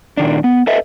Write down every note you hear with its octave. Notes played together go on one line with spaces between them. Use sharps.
A#2 D#3 D4
B3
A4 B4 D#5 E5